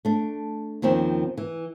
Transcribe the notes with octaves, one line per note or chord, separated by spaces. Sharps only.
A3 D4
D#2 D#3 F3 C4 C#4
E3